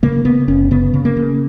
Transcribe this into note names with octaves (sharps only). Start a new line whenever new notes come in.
C#3 A#3
C#3 B3
F#1 C#4
C#3 B3
C#3
A#3
C#3